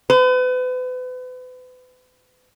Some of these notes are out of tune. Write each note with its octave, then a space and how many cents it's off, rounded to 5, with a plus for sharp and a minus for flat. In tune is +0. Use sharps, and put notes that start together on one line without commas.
B4 +35